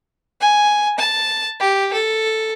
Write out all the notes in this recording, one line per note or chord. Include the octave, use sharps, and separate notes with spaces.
G#5
A5
G4
A4